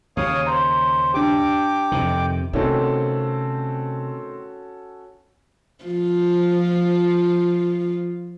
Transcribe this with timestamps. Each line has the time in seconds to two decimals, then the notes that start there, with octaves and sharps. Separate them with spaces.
0.17 D#2 C#3 C#5 F5 D#6
0.47 C5 A#5
1.14 D4 G4 G5 D6
1.92 F2 C3 D#3
2.53 C3 D#3 A3 C4 C#4 F#4 A4
5.84 F3 F4